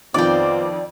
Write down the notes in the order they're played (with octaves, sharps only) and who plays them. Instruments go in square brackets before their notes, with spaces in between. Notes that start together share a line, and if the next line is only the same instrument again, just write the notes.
[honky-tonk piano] F2 D#3 D6 [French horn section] B3 C4 F4 [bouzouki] D5 G5